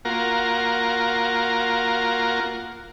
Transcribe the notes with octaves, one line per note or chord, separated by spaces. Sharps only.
A#3 F4 F#4 A#4